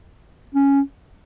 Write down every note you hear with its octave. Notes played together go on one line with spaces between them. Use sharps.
C#4